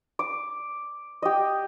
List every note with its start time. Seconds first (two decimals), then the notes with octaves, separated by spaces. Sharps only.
0.19 D6
1.22 G4 D#5